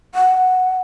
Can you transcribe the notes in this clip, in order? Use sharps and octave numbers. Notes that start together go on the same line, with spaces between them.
F#5